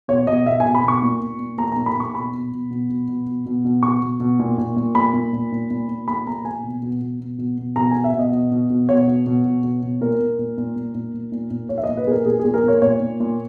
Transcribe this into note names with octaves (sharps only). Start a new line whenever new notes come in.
B2 C#5
B2 D#5
B2 E5
B2 G#5
B5
B2 C#6
A#2
A#2
A#2
A#2 A#5
A#2 A#5
B5
A#2 C#6
B2 B5
B2
B2
B2
B2
B2
B2
B2
B2
B2 C#6
B2
B2
A#2
A#2
A#2
A#2 B5
A#2
A#2
A#2
A#2
A#2
A#2 B5
A#2 A#5
A#2 G#5
B2
B2
B2
B2
B2
B2
B2 A#5
B2 G#5
E5
B2
D#5
B2
B2
B2
B2 C#5
B2
B2
B2
B2
B2
A#2 A#4
A#2
A#2
A#2
A#2
A#2
A#2
A#2
A#2
A#2 C#5
E5
A#2 D#5
B4
A#2 G#4 A#4
A#2 G#4
A#2 G#4
A#4
A#2 C#5
A#2 C#5
A#2
A#2